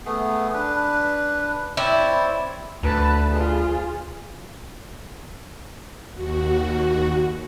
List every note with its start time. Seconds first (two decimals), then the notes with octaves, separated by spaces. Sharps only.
0.06 A3 B3 G#4
0.53 D4 B4
1.77 C4 E4 C#5 D5
2.83 D2 B4 A5
3.30 F4 G#4
6.12 D#2 F#4